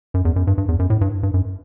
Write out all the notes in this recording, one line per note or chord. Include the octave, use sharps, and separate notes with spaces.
F#2
E2
F#2
G2
G2
E2
F#2
A2
G2
G2
F#2